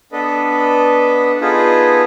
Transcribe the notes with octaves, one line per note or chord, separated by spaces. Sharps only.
B3 D4 A4 B4 D#5
B3 D#4 F4 G#4 A4 B4